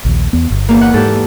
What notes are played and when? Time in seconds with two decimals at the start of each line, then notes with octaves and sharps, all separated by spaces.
0.05 A#1 D#2
0.33 E2 B3
0.51 G1
0.69 E2 A#3
0.81 F#5
0.94 G#2 G4 A4